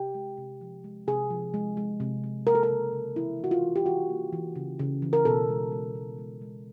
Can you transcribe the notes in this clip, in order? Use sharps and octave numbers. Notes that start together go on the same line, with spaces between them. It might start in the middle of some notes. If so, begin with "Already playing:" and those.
Already playing: C3 G4
G#3
C3
F3
G#3
C3 G#4
F3
G#3
G#3
C3
C3
A#3 A#4
A4
A#4
C#3
C#3
E3 E4
E3 F#4
F4
E3
G4
E3 F#4
A#3
E3
C#3
C#3
E3
A#4
B2 A4
G#3
G#3
G#3
G#3
G#3